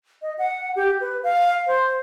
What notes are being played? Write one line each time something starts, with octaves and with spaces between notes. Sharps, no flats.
D#5
F#5
G4
B4
F5
C5